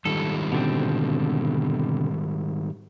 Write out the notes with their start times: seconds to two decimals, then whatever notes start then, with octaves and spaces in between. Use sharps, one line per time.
0.05 G#2 D#3 G3 A4
0.52 B2 D3 C4